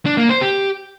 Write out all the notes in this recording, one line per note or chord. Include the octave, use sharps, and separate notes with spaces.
D4
A#3
C5
G4